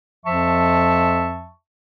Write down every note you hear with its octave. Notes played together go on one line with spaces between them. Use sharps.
F2 F3 E5 A5 C#6